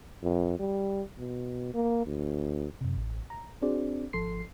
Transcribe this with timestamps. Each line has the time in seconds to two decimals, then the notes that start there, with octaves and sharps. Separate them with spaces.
0.23 F2
0.59 G3
1.19 B2
1.74 A#3
2.06 D2
2.81 F#2 C3
2.97 A1
3.30 A#5
3.62 C4 D4 F#4 G#4 C5 D5
4.13 G#1 F3 A4 C6 C7